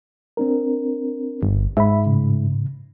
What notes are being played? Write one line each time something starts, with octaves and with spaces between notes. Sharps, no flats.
C4 D4 A#4
G1
G#2 E5 B5
A2 C#3